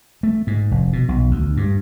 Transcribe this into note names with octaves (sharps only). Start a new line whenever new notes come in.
A3
G#2
F1
B2
B1
D2
G2